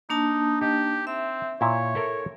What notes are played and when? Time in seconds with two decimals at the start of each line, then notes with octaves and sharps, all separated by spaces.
0.10 A#3 D4 D#4 A5
0.61 D#4 G4
1.07 C4 E5
1.61 A#2 E4 C#5
1.95 E4 A4 A#4